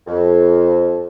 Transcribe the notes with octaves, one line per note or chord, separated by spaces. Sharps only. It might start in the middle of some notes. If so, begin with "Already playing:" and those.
F2